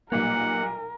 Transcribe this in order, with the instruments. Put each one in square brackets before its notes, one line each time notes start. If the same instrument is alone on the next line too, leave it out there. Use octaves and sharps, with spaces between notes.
[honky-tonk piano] B1 A#2 G3 [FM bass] A#3 [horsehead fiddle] A#4 [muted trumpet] F#5